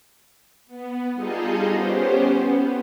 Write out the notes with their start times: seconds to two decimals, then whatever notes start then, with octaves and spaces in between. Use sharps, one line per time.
0.67 B3
1.14 G3 D#4 F4 G#4 A4 D#5
1.68 B3 C#4 G4 C5
2.36 B3